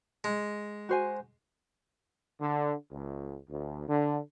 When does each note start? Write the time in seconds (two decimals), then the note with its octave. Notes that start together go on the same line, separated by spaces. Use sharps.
0.24 G#3
0.89 F#4 C5 G#5
2.41 D3
2.92 C#2
3.50 D2
3.88 D3